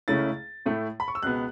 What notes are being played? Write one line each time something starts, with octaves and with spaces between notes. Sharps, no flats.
C#2 C#3 A3 C#4 E4 A6
A2 A3 E4
B5
C#6
E6
C#2 B2 B3 F#6